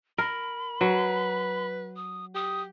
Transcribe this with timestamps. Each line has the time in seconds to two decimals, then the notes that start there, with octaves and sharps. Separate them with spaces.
0.18 A#4 B5
0.81 F#3 B4
1.96 D#6
2.35 G4 D#6